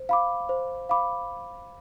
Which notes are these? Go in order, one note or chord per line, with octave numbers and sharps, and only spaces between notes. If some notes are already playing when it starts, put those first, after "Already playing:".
Already playing: C5
F5 B5 D6
C5
F5 B5 D6